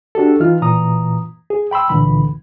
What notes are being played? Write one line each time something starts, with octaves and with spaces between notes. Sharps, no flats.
D4 F#4 G4 A4
E3 D#4 F4 F6
A#2 E3 A#5 D#6
G#4
G5 B5 C6 E6
C#2 A#2 D3 E3 B5